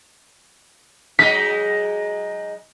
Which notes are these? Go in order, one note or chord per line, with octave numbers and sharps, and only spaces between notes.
F#3 G#3 D#4 B6